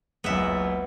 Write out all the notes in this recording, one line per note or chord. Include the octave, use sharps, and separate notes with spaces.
F#1 C#2 F#2 B3 E5